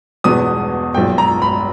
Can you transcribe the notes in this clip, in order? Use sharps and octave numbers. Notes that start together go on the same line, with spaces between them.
E1 E2 B2 G#3 B3 D#6
B1 A#2 G#3 G5
A#5
B5